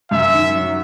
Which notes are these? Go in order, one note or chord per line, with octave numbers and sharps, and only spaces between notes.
F#2 E5
D#3
F#3